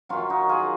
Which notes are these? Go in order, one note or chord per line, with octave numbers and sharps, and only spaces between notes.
F#2 D#3 F#3 C#4 F4
D#4 F#4
F4 G#4